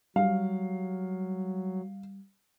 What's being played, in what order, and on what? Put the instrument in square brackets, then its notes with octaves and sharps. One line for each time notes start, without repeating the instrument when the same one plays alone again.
[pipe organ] F#3 [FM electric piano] G3 [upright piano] F5